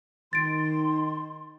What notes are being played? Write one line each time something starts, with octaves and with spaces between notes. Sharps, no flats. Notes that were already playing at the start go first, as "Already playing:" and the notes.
D#3 C6 A6 D7